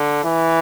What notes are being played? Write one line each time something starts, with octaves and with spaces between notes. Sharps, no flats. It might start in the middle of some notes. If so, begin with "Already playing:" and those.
Already playing: D3
E3